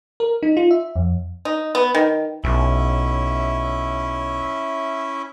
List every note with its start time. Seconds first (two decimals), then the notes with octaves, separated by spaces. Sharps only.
0.20 A#4
0.43 D#4
0.57 F4
0.71 E5
0.96 F2
1.45 D#4
1.75 B3
1.95 D#3
2.44 B1 C#4 E4 E5